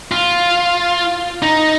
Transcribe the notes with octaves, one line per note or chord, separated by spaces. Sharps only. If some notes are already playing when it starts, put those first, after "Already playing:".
F4
D#4